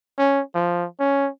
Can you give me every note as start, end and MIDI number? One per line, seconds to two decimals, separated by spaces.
0.18 0.41 61
0.55 0.86 53
1.00 1.29 61